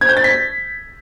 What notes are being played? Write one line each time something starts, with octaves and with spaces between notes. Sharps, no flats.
G#6
G6
A6
B6